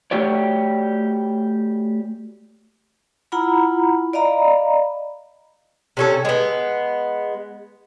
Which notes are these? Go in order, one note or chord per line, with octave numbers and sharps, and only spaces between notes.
A3 F#4 G4 C#5 D5
E4 F4 F#5 A#5 B5
D5 D#5 F5 A#5 B5
C3 C#4 A4
G#3 B3